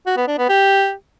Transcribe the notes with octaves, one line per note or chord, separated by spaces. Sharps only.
F#4
B3
D4
B3
G4